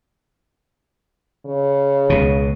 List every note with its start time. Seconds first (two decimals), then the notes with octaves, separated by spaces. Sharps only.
1.46 C#3
2.10 C#2 B2